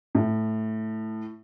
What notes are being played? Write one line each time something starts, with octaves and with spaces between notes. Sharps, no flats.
A2